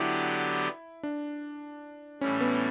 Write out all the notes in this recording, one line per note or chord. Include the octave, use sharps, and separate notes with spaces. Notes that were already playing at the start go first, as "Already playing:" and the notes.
Already playing: D3 F#3 B3 D4 E4 G4
D4
A2 E3 G3 C#4
B3